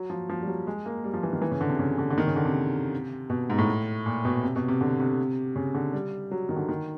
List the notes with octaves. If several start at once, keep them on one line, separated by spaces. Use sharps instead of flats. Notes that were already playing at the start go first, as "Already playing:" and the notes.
Already playing: F#3
F3
F3
G3
F#3
G#3
A#3
G3
F3
E3
D#3
E3
C#3
D3
C3
C#3
D3
D3
D#3
C#3
D3
C3
B2
G#2
A2
A#2
B2
C3
B2
C3
D3
C3
C#3
D3
G3
F#3
D#3
D3
D#3